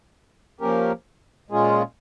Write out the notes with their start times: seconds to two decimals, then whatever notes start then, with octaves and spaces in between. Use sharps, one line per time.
0.60 F3 A#3 C#4 G4 A#4
1.50 A#2 G#3 C#4 F4 G#4